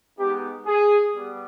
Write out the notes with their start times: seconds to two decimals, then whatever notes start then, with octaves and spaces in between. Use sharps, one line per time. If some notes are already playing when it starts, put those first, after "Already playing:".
0.17 G#3 B3 D#4 G4
0.66 G#4
1.15 G3 B3